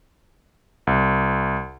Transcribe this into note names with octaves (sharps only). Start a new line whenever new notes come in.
C2